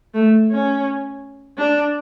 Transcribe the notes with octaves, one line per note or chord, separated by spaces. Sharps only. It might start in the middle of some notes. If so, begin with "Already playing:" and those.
A3
C#4
D4